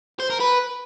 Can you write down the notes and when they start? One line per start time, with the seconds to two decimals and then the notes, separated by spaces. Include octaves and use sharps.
0.20 C5
0.30 A#4
0.40 B4